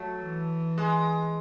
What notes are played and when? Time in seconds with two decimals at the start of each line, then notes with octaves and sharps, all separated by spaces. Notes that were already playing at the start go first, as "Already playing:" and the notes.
Already playing: F#3 A3
0.21 E3
0.78 G#3